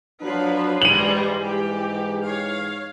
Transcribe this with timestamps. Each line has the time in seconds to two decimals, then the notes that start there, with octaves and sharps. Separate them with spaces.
0.22 F3 F#3 D4 B4
0.82 G#2 E3 G3 G#3 D#7 F#7
1.44 G4
2.24 C#5 F5